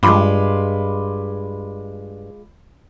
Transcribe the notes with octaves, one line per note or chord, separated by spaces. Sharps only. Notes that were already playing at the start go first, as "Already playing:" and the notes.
G2 G#3 F4 B5 C6 D6